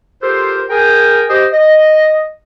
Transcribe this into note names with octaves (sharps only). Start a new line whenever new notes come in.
F4 G4 A4 A#4 C5
G#4 A#4 G5 G#5
G4 C5 D#5
D#5